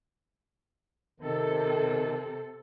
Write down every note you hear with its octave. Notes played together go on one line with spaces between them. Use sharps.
C3 D#3 A4